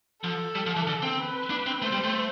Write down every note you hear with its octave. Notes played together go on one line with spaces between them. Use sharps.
F3 A4
G3
F3
E3
D3
C4
B4
D4
C4
A3 C5
G3
A3